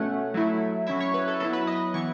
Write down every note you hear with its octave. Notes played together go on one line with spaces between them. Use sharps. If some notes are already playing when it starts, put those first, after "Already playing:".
Already playing: B2 A3 C#4 F#5
F#3 A3 E4
F#3 C#4 E4 E5
C#5
B4
A4
F#3 B3 E4 A4
B4
D#5
E3 B3 E4 C#6